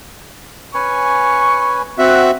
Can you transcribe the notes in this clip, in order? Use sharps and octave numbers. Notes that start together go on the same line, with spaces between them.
C#4 B4 G#5 C#6
C4 F#4 E5 F#5